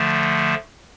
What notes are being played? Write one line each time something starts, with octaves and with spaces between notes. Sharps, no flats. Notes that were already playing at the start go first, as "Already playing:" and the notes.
Already playing: D3 F3 A3